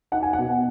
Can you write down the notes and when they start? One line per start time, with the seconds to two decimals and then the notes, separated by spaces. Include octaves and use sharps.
0.12 D#4 F#5
0.23 G#5
0.33 B2 F#5